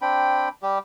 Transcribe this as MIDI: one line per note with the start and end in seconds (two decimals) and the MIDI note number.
0.02 0.49 60
0.02 0.49 62
0.02 0.49 79
0.02 0.49 83
0.63 0.78 55
0.63 0.78 67